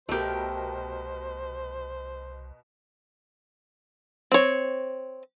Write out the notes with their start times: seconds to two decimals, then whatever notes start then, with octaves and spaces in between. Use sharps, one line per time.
0.09 C2 B2 A3 G4 A#4 C5
4.32 C4 C#5